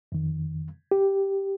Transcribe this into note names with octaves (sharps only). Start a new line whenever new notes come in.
F2 D#3
G4